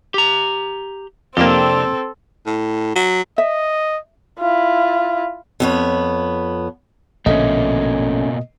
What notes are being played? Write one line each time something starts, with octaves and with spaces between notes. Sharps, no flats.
G4 A#5
F2 C3 A#3 C4 D4 G4 A4
A2
F#3
D#5 E5
E4 F4
F2 B3 C#5
A#1 B2 D3 A3 A#3 C#4 D#5